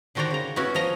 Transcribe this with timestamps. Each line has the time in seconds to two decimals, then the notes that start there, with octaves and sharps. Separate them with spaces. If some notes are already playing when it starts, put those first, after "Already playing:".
0.15 D3 D#3 F#4 C5 D5 A#5
0.31 C#3 A#5
0.56 B3 C#4 E4 F#4
0.75 F3 D#5 A#5